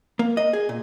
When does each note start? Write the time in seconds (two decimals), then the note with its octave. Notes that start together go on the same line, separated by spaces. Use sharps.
0.19 A#3
0.37 D#5
0.53 G#4
0.69 A#2